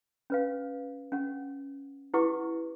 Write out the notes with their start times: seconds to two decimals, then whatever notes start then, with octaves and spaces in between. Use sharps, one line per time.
0.30 C#4 B4 F5
1.12 C#4 F#5
2.14 E4 G4 B4 F#5 C#6 D6